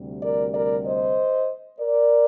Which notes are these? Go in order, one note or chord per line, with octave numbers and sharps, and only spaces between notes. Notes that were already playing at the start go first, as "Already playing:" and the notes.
Already playing: D2 C3 G3
A#4 D5
A#4 D5
C5 D#5
A#4 D5